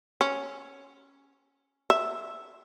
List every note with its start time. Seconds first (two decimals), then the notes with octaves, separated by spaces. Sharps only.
0.21 C#4
1.90 E5